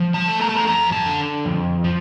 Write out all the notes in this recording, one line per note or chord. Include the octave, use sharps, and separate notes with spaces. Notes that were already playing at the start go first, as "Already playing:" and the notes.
Already playing: F3
A5
A3
A#5
A5
A#5
F2 A#5
A5
D3
F2
F3